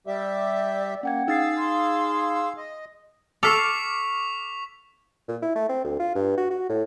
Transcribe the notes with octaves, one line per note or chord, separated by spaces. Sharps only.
G3 G4 D5 E5
A#3 C#4 F#5 G5 G#6
D#4 G#4 F5 E6 A6 C7
C6
D#5
A4 C#6 D6 F6 B6 C7 F7
A#2
E4
A3
C4
D2
F4
G2
F#4
F#4
A2